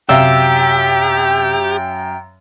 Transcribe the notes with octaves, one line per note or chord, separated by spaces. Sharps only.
F#2 C3 G4 E5 F5 G5 E6